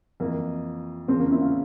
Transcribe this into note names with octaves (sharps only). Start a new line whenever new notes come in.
F2 E3 A#3
E2 C#3 F3 C4
A#3 C#4
C4 E4
C#4 F4